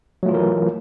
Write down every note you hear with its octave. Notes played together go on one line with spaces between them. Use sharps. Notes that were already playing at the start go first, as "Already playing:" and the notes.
E3 F#3 A3 F4 A#4